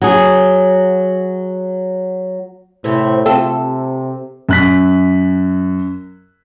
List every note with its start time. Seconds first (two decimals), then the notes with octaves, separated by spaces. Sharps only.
0.02 F#3 G#4
2.84 A2 C3 E3
3.26 C3 A3 C4 F4 A4
4.49 F#2 F#6 B6